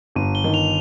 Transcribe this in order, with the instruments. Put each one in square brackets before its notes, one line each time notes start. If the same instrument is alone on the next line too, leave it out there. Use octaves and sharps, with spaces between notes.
[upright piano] G1 [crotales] D#7
[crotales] G7
[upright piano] D#3
[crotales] F7